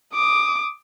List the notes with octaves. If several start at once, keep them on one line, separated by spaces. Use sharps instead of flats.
D6 D#6